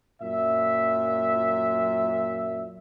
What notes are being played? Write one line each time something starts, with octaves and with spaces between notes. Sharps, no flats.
F#2 A#2 E5